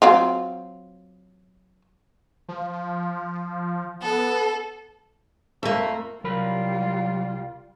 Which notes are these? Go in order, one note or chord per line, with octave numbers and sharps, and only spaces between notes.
F#3 C4 F4
F3
B3 A4
F2 A3 A#3
C2 F#3 G3 F4 A#4 B5